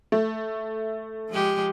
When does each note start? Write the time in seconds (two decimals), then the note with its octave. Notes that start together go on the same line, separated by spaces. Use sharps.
0.12 A3
1.29 F3 G#3 G4